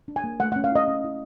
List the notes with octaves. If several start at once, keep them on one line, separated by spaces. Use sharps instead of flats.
D4
G#5
A#3
A3 F#5
C#4 F#5
F5
E4 D#5
C#4
E4